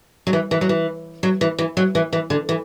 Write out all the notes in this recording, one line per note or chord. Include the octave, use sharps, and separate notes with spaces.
F#3
E3
E3
F#3
E3
F#3
E3
E3
F#3
E3
E3
D3
E3